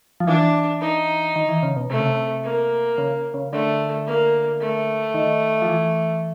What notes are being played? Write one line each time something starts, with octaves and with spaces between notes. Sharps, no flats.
F3
E3 D4
D#4
D#3
E3
C#3
B2
C3 A3
C#3
C3
A#3
C#3
C#3
D3 A3
A#3
A3
D#3
F3
E3